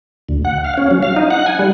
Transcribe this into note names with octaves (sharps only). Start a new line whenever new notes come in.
D2
F#5
F5
C#4
F#3
F5
D#4
F#5
G#5
G3